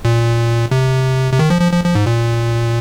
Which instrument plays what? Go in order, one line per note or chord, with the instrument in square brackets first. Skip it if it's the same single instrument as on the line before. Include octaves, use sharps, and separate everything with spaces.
[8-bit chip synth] A#2
C3
C3
D#3
F3
F3
F3
F3
G#2
A#2